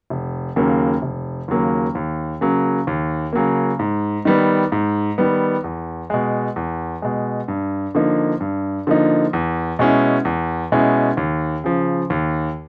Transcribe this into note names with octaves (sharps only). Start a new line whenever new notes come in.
F1
D#2 C#3 F#3 A#3
F1
D#2 C#3 F#3 A#3
D#2
C#3 F#3 A#3
D#2
C#3 F#3 A#3
G#2
D#3 G3 B3
G#2
D#3 G3 B3
E2
B2 G#3
E2
B2 G#3
G2
D3 F3 A#3 D#4
G2
D3 F3 A#3 D#4
E2
B2 G#3 C#4 E4
E2
B2 G#3 C#4 E4
D#2
C#3 F3
D#2